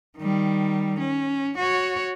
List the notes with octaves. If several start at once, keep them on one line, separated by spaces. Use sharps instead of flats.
D#3 G3
C#4
F#4 C#5